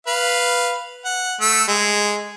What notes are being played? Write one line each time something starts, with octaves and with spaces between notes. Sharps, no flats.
B4 F5
F#5
A3 E6
G#3